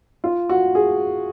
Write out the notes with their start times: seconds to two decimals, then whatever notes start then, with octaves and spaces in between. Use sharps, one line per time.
0.24 F4
0.49 F#4
0.75 G#4